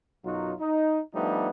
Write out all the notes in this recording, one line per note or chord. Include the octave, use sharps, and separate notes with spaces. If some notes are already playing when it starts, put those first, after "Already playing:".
B1 F#2 F#3 D#4 F4 F#4
D#4
F3 G3 A3 B3 D4 D#4